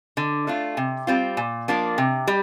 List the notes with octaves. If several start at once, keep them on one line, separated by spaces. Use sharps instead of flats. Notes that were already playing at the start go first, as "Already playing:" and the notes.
D3
A3 D4 F4
C3
G3 C4 F4
A#2
F3 A#3 D4
C3
G3